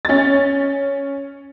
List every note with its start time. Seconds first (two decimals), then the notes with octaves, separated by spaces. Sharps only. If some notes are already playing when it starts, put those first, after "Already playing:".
0.05 C#4 A6